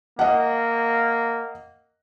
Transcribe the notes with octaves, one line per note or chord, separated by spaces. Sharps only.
A#3 D#5 F#5